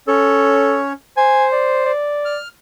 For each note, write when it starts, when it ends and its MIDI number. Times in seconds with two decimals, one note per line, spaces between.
0.08 0.93 61
0.08 0.78 69
0.08 0.93 73
1.17 1.92 72
1.17 1.46 80
1.52 1.81 74
1.85 2.37 74
2.25 2.48 89